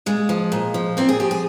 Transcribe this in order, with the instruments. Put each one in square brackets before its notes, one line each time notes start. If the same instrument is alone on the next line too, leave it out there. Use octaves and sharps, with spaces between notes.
[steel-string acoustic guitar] A#2 G#3
F3
A#2
F3
A#2 C4
G#4
F3 G4
G#4